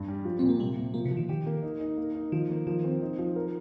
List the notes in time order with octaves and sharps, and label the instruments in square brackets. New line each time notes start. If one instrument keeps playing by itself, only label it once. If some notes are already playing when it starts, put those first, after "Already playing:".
Already playing: [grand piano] G2
G3
F3
[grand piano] A#2 [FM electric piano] C4
[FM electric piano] A#3
[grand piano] C3 [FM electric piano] G3
[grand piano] C3
[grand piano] F3 [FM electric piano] A#3
[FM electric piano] C3
[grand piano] F3
[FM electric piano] D#3
[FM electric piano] D#3 [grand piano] G4
[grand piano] A#3
D#4
D#4
A#3
D#4
[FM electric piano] D#3 [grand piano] F3
[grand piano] A#3
[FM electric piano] D#3 [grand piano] F3
[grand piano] C4
D#4
F3
A#4